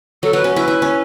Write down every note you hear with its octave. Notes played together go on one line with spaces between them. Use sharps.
F#3 A4
F#3 B4
C#4
E4 B4
E4
C#4